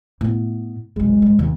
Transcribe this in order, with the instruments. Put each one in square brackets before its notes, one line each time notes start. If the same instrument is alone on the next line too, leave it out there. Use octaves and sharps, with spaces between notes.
[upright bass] A2 B3
[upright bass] F1 B1 [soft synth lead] G#3
[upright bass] G#2 G3
[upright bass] D#2 [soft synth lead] C3